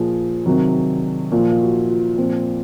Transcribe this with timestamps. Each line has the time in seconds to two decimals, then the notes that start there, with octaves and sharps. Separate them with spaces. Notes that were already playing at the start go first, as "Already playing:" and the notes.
Already playing: A#2 F3 G#4
0.46 C3 D#3 F#3
1.32 A#2 F3 F4
1.52 F4
1.61 F#4
1.90 F4
2.18 A#2 F3 C4